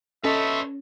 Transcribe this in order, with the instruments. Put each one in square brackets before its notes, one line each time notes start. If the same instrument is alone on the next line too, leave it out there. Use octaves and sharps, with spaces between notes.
[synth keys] C#4 [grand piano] A4 D#5 [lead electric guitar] B4 C#5 [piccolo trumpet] E5